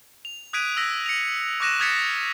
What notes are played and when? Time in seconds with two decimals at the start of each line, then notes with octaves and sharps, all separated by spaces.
0.25 F7
0.53 D#6 F#6 G#6 B6 D7 D#7
0.77 E6 A#6 B6
1.06 C#7 F7
1.60 C#6 D6 F#6 A#6 D#7 E7
1.80 D#6 F6 G#6 A6 B6 C#7